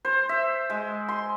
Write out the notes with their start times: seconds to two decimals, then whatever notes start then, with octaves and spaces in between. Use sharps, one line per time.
0.05 C5
0.29 E5
0.70 G#3
1.08 C6